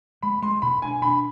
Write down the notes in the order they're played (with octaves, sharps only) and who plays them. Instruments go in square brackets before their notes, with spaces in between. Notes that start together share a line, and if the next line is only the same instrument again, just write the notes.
[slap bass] G#3 [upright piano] B5
[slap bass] G#3 [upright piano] C6
[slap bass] B2 [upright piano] B5
[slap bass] D4 [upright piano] G#5
[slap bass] D4 [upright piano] B5